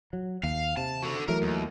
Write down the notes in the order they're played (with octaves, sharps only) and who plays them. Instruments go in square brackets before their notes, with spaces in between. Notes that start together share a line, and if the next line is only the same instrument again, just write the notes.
[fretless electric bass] F#3
[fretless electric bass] D#2 [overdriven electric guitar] F5
[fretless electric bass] C3 [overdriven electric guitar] A5
[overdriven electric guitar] F#4 A4
[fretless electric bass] E3 F#3 A3 [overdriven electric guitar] A#4
[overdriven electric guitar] D#2